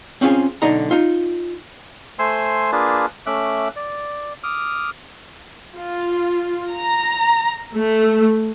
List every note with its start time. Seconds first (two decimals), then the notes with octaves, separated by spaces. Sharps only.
0.21 C4 C#4 F4 G4 G#4
0.62 B1 D3 D#4 A#5
0.91 D#4 F4
2.19 A3 C5 G#5 C6 E6
2.72 A#3 D4 F4 G#4 B4 A5
3.26 A3 C#4 E5 D6 F#6
3.76 D5
4.43 D6 D#6 F6
5.76 F4
6.71 A#5
7.76 A3